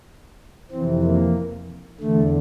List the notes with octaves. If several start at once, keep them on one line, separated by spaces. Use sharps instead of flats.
F2 C3 E3 C4
A#3
E2 D3 A3